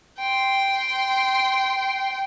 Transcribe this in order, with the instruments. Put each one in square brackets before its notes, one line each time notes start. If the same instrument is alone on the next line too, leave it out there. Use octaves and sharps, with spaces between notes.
[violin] G5 C6